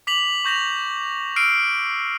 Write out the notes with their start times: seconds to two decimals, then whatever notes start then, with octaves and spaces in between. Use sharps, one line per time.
0.07 D6 B6 F7 F#7
0.45 C#6 G6 A#6 B6 F7
1.36 E6 F6 C7 D7 D#7